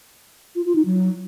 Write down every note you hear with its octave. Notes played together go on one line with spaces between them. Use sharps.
F4
F4
D#4
F#3